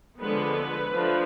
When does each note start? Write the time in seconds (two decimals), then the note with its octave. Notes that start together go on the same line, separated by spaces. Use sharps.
0.20 D3 F3 G#3 B3 B4
0.91 F3 A3 D4